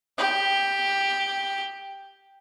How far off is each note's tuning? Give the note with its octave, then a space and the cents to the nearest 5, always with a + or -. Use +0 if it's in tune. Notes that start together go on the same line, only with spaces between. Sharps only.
G4 +5